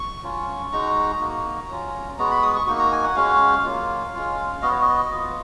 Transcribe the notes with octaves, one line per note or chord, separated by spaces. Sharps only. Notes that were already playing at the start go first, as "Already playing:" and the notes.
Already playing: C#6
F#3 C#4 F4
G#3 D#4 F#4 A#5
A#3 D#4 F#4
F#3 C#4 F4
G#3 B3 F#4 A#5
B5
D#6
C#6
A#3 D#4 F#4 C#6
A#5
G#5
F#5
G#3 C#4 F#4 F5
F#3 A#3 F4
G#3 C#4 F4
B3 F#4 D#5
C#5
D#5
B3 F4